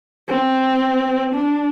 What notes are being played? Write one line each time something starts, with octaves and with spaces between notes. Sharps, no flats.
C4
D4